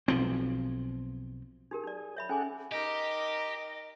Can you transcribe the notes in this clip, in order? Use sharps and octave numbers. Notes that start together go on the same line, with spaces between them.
B1 F3 C4
D#4 G4 G#4 A#4
D#4 D5
C#5 E5 B5
C#4 G#4 A4 F#5 G#5 D6
D#4 G4 A#4 D#5 D6